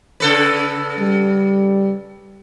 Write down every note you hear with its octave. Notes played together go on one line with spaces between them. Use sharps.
C#3 A4 B4
G3